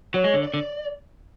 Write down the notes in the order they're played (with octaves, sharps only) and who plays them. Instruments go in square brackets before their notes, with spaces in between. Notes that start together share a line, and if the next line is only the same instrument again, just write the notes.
[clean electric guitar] F#3 [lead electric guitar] C#5
[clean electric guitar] G#3
D3
[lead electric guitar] D5
[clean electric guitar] D3